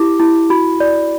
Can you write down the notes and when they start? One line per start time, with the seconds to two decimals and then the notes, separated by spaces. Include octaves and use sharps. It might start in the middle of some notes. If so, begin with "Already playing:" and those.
Already playing: E4 G4 D6
0.20 E4
0.50 F#4 B5
0.80 D5